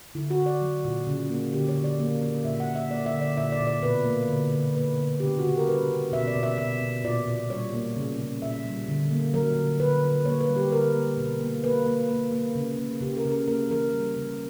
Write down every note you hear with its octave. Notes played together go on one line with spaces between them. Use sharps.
D3 E4
F#4
D3
D5
F#3
A#2
C#3
A#3
D3 G4
C#5
D3
D5
A#3
A#3
A#2 E5
F#5
A#3
E5
A#3 D5
E5
D3
D5
A#2 E5
D5
A#2
D5
B2 B4
A#3
D3
D3
A#3 B4
D3
C#3 G4
F#4
C#3 G4
A#4
G3 B4
C#3
B2 E5
D5
B2
E5
B2 E5
B2
A#2 D5
A#2
G3 C#5
A#3
C#3
C#3
A#2 E5
G3
D3
A#3
F#3 A#4
D3
D3 B4
D3
A#3 C#5
B4
G3
G4
D3 A#4
A#3
B2
A#3
A#3 B4
A#3
A#3
A#3
C#3
A#3
C#3 G4
A#4
C#3
A#4
A#3 A#4
E3 A#4
G3
C#3